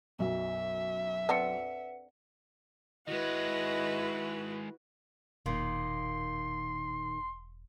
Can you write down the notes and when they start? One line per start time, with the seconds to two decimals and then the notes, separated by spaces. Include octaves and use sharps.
0.19 B1 F#2 E5
1.29 C4 D4 A4 B4 F#5 C#7
3.07 D#3 G#3 E4 F#4 B4 D#5
5.46 E1 A#2 D#3 A#3 C6